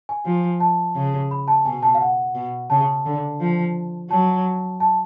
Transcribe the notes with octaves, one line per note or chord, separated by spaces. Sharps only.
G#5
F3
A5
C#3
B5
A5
B2 G#5
A5
F5
F#5
B2
C#3 A5
D3
F3
F#3 A5
A5